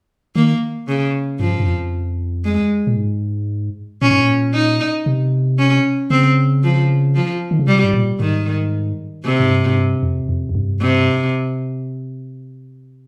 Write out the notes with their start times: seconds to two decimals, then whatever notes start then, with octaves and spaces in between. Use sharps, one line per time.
0.36 D#3 A#3
0.88 C#3
1.40 G2 F3
1.60 G2
1.66 F2
2.45 G#3
2.87 A#2
2.97 G#2
4.02 A#2 C#4
4.11 G#2
4.20 A#2
4.54 D#4
5.06 C3
5.59 C#4
6.10 C#3 C4
6.63 F3
7.15 F3
7.51 D#3
7.59 C#3
7.67 C3 G3
7.84 G#2
7.93 A#2
8.20 G#2 D#3
9.24 C3
9.40 G#2
9.50 G2
9.68 G#2
9.76 G2
10.03 F2
10.29 F2
10.49 F2
10.55 G2
10.81 C3